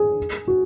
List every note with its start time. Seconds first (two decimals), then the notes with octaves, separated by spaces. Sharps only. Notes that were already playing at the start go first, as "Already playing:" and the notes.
Already playing: G#4
0.48 F#4